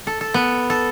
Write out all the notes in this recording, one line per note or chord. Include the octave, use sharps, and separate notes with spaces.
A4
A4
B3
A4